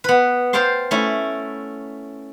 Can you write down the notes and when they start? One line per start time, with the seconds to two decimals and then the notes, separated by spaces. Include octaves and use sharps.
0.04 B3 B4
0.53 C5 F5 G5 A5 C6
0.91 A3 C#4 E4